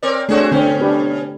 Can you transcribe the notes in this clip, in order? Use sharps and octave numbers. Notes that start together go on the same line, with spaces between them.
C4 A#4 D5
A3 C4 D4 F#4 G#4 C#5
B2 D3 C4 C#4
D4 G4 B4